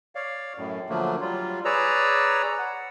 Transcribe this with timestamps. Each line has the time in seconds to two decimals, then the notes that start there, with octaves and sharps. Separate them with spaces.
0.15 C#5 D5 F5
0.57 F#2 A2
0.89 D3 F3 F#3 A3 A#3
1.21 F#3 G3 F4
1.65 G#4 B4 C#5 D5 A#5 E6
2.59 F#5